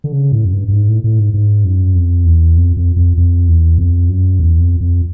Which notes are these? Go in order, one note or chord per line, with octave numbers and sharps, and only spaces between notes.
D3
C#3
A2
F#2
G2
G2
G#2
A2
A2
G#2
G#2
F#2
F2
E2
F2
F2
F2
F2
E2
F2
F#2
E2
F2
F2